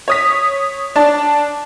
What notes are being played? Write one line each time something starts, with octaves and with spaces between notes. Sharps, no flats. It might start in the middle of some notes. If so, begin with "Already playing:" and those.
C#5 D#6 B6
D4 D5 A5